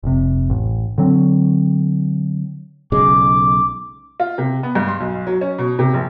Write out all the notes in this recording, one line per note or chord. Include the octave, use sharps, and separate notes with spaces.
F1 C3
A1
D3 F#3 C4
B1 C#3 G#3 D6
F4
C3
B3
G2
C6
B1
F#3
C#4
B2
C3
A#1